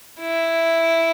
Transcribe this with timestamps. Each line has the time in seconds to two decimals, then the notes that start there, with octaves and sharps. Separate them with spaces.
0.21 E4